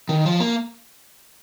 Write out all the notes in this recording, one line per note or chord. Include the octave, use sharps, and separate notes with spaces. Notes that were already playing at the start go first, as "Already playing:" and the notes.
D#3
F3
A#3